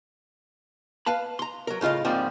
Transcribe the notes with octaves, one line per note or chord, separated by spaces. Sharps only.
B4 F5 A5 B5
A#5 C6
F#3 A#4
A2 C#3 F4 D#5 F5
G#2 F3 G3 A#3 C4